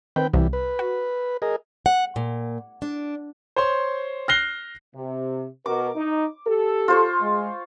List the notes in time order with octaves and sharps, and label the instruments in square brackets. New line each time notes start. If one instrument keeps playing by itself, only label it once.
[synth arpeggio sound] D#3 [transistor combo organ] C4 B4 G5
[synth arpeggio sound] C2 [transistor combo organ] E3 G3
[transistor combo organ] B4
[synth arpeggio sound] F#4
[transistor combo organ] G#4 A#4 D#5
[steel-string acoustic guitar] F#5
A#2
D4
[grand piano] C5 C#5 C6
F6 F#6 A#6 C7 G7
[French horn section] C3
[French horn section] B2 F#4 A#4 [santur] D6
[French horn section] D#4
G4 A4
[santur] F4 C5 C#6
[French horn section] G#3